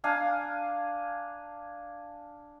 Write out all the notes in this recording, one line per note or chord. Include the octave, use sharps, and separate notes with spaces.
D4 F5 G#5 A#5